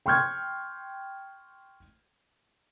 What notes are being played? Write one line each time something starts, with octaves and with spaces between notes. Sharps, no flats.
G5 C6 C#6 F6 G6 G#6